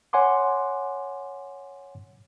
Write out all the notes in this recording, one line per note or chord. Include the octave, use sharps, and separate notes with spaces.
C#5 F#5 G#5 C6 D6